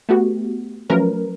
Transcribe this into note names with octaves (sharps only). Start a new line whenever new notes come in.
A3 B3 F#4 G4
F3 F#3 A3 C#4 A#4 B4